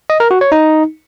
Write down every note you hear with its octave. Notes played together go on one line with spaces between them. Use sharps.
D#5
A#4
F#4
C#5
D#4